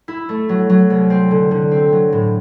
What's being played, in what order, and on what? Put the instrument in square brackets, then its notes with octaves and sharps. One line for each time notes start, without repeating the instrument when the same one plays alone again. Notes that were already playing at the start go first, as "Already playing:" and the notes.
[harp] E4
A3
F#3
F#3
C2
C4
D3
D3
C4
F#3
A2